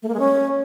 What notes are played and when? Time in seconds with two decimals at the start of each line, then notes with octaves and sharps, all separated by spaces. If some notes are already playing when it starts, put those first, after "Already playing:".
0.03 A3
0.08 A#3
0.14 G#3
0.20 C#4